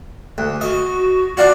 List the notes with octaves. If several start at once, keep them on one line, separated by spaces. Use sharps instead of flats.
D2
F#4 D#5
D4 F4 F#4 D5